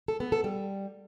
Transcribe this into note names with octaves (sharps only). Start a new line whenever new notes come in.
A4
B3
A4
G3